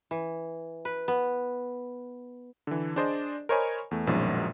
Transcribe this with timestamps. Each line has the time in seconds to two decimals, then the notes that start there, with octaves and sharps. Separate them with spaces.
0.11 E3
0.85 B4
1.08 B3
2.67 D3 E3
2.96 D4 G#4 C5 D5 D#5
3.49 A#4 C5 C#5 D#5 G#5 B5
3.91 E2 A3
4.07 A#1 F#2 B2 D#3 F3 G#3